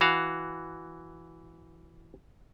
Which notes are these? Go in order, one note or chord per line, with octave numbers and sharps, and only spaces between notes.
E3 F#4 F5